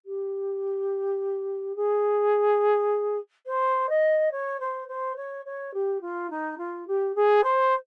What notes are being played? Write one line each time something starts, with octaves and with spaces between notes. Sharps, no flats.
G4
G#4
C5
D#5
C#5
C5
C5
C#5
C#5
G4
F4
D#4
F4
G4
G#4
C5